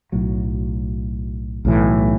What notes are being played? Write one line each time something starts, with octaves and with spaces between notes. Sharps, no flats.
B1 A2 F#3
B1 A2 E3